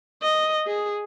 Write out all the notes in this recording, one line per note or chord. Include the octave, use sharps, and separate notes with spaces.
D#5
G#4